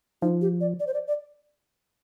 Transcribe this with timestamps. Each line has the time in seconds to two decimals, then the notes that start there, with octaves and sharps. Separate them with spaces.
0.22 F3 D#4
0.41 G4
0.61 D5
0.80 D5
0.87 C5
0.94 D5
1.08 D5